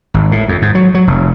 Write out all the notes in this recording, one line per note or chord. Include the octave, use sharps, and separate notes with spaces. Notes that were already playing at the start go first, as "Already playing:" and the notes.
G#1
A2
F2
G#2
F#3
F#3
F1